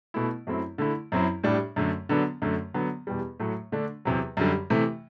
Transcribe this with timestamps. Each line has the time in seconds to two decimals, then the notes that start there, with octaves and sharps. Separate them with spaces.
0.14 B2 A3 E4
0.47 F#2 F#3 A3 C4 E4
0.78 D3 A3 E4
1.12 F#2 F#3 C4 E4
1.44 A2 G3 D4
1.76 F#2 D3 A3
2.09 D3 F#3 B3 D4
2.42 F#2 D3 A3
2.74 D3 F#3 B3
3.07 E2 B2 G3
3.40 A2 F#3 A3
3.72 D3 A3 D4
4.05 E2 C3 F#3
4.37 F#2 D3 G3
4.70 C3 E3 A3